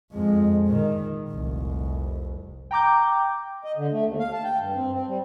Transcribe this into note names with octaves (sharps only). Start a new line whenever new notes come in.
F2 G#3
A#2 D#3
F1 C2
G5 A#5 D6 G6
D#5
D3
A3
D#2
F5
A5
G5
G2
C4
C4
G3